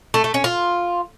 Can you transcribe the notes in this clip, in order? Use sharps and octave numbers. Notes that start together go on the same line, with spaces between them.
A3
A3
C#4
F4